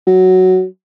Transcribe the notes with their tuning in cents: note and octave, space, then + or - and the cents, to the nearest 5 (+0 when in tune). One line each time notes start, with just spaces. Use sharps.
F#3 +5